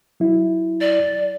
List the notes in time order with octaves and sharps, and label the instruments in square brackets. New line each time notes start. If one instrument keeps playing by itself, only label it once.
[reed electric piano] F#3 E4
[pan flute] D5